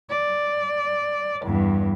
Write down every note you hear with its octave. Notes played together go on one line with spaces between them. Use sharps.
D5
E2 G2